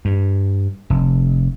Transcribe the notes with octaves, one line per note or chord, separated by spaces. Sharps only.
G2
F1